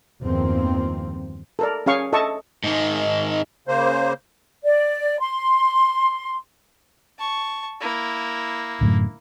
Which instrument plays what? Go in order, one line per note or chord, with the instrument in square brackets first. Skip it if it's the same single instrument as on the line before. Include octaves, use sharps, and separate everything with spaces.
[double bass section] E2 G2 D#3 F3 A#3 C4
[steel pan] A4 A#4 D5
C#4 G#4 F5 C#6
A4 D#5 E5 A5 C#6
[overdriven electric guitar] G#2 D#3
[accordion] C#3 A#3 C5
[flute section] D5
C6
[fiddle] A5 C#6
A#3 E4
[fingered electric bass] F#2 A2 D3